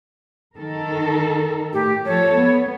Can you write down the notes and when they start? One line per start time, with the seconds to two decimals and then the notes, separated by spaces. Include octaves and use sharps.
0.56 D#3 A4 A#4
1.73 A2 G4
2.05 F3 A4 C#5
2.36 B3